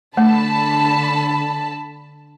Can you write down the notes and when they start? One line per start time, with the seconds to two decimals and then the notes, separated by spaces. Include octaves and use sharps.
0.17 D3 A3 A5 B5